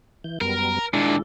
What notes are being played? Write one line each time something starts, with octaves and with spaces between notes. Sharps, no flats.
E3 G6
F#2 G3 B3 A#4
D#2 A#2 G#3 D4 E4